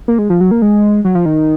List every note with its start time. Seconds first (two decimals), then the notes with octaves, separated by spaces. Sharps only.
0.08 A#3
0.18 G#3
0.30 F3
0.41 F#3
0.51 A#3
0.62 G#3
1.05 F#3
1.15 F3
1.26 D#3